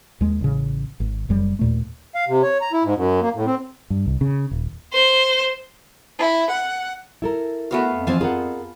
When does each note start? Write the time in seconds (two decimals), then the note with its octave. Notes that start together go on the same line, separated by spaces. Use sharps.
0.21 D#2 G#3
0.41 A1 C#3
1.00 G#1
1.29 F#1 F#2 G3
1.59 D#2 A#2 A3
2.15 F5
2.28 C3
2.43 C#5
2.61 A#5
2.73 E4
2.84 G#2
2.95 F#2
3.21 A#3
3.34 A2
3.46 C4
3.90 G2
4.06 C2
4.21 C#3
4.51 D#1
4.93 C5
6.19 E4
6.51 F#5
7.22 E4 A4 A#4
7.71 A3 B3 F#4 F5
7.93 F2
8.07 E3 F3 C4 F5 G#5 A5
8.21 F4 G#4 A#4 F#5